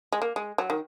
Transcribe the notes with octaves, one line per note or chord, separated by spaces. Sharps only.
G#3
A#3
G#3
F#3
D#3